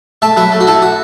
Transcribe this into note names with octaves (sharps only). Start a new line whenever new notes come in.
A3 E5 A5
F#3 B4 E5
A3
F#4
A3 E4 A4
F#4